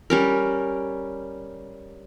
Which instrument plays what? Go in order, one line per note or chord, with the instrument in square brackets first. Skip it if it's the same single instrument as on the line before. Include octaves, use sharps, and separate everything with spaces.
[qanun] G3 C#4 A#4